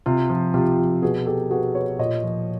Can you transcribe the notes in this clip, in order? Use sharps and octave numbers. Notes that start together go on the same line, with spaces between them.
C3 F4
F3
C3 F4 G4
F3
B2 F#4 G#4
G4 A4
B2 F#4 G#4
B4 C#5
A#2 C#5 D#5
F3